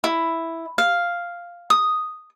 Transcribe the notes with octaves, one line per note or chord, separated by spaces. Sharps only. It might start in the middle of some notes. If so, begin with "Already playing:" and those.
E4
F5
D#6